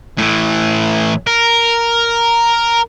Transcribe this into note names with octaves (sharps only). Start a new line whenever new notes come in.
A2 E3
A#4